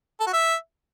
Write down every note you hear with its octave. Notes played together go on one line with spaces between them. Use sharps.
A4
F#4
E5